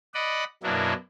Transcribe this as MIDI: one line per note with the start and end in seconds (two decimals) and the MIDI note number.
0.14 0.44 74
0.14 0.44 75
0.14 0.44 78
0.14 0.44 83
0.63 0.93 42
0.63 0.93 47
0.63 0.93 54
0.63 0.93 58
0.63 0.93 62
0.63 0.93 64